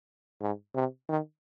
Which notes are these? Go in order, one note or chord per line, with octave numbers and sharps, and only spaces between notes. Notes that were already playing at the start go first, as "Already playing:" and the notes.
G#2
C3
D#3